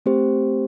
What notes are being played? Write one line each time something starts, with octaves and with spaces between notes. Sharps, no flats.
A3 C4 G4 C5